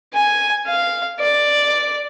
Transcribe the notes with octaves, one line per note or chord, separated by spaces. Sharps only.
G#5
F5
D5